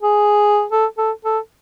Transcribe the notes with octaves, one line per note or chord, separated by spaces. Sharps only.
G#4
A4
A4
A4